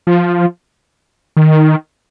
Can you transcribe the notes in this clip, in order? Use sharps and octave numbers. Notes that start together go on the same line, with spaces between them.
F3
D#3